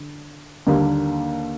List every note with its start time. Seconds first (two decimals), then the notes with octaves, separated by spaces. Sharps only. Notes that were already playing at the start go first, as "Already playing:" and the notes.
Already playing: D3
0.66 D#2 D3 G3 A#3 D4